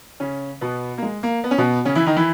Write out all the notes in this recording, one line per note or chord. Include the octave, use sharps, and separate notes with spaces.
C#3 C#4
B2 B3
A#3
G#3
A#3
B3
C#4
B2 B3
C#3 C#4
E3 E4
D#3 D#4
E3 E4